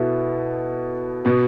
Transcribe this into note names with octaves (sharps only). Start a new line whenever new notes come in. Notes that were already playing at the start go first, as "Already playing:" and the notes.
Already playing: B2 B3 E4 A4
B2 B3